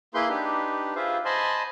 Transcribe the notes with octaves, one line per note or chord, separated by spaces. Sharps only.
A#3 E4 G#4 B4 C6 G6
D4 D#4 G4 B4
F4 G#4 B4 C5 E5 F5
C5 D#5 G#5 A5 B5 C6